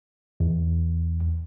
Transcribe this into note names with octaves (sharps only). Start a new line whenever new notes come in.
E2